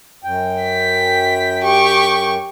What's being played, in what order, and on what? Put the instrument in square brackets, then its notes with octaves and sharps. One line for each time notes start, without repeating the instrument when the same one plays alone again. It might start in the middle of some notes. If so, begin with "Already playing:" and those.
[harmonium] F#2 G5
[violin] B6
G4 C#6